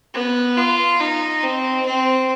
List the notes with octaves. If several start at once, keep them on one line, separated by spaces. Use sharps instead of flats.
B3
F4
D#4
C4
C4